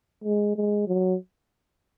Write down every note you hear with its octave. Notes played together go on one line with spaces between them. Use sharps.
G#3
G#3
F#3